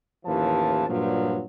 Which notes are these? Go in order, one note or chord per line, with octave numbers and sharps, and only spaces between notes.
A1 D#2 E3 F3 A5
G2 A#2 F3 F#3